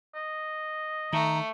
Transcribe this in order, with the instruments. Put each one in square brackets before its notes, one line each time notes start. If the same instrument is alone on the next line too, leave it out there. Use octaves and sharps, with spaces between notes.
[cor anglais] D#5
[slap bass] D#3 [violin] A3 [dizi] A#5